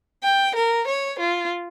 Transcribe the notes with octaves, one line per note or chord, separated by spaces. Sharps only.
G5
A#4
C#5
F4